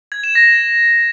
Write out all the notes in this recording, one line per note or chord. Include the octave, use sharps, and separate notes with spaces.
G#6
E7
A#6